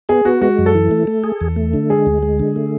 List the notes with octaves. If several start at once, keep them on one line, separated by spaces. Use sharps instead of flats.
B3 G#4
B3 F#4
G#3 F#4
F#2
A4
E3
A3
A3
G#4
E2
A3
D3
G#3 G#4
D2
G#3
D3
A3